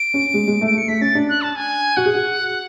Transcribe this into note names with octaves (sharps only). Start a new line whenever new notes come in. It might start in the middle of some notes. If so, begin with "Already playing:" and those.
Already playing: D7
C#4
G#3
G#3
A3
D7
A3
C#7
A3 B6
C#4 A6
D4
F#6
A5
G#5
F#4 F#5
G#4
F#4